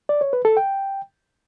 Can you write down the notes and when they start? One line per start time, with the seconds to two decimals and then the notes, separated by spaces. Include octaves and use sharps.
0.09 D5
0.21 C#5
0.33 B4
0.45 A4
0.57 G5